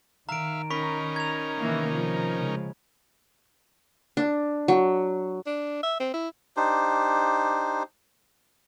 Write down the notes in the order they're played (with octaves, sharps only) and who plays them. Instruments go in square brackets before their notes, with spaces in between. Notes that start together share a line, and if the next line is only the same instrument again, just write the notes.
[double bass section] D#3 [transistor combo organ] E5 F5 [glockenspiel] A#5 D7
[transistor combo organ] C#4 D#4 A#4 [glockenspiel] B5 C#6 B6
[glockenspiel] G#6 F7
[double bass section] C3 D#3 [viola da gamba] E3 A#3
[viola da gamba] F3
[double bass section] C#3 G#3
[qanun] D4
F#3
[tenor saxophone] D4
E5
C4
E4
[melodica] D4 D#4 G4 C5